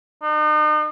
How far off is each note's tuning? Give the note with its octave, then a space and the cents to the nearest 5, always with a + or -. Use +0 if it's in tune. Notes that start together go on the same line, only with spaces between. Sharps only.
D#4 -40